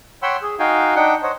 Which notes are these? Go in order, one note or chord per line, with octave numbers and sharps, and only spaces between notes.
C#5 F#5 G5 B5 C6 E6
G#4
D#4 F#4 F5 G5 G#5
D4 D#4 F#5 G5
C5 C#5 D#5 F#5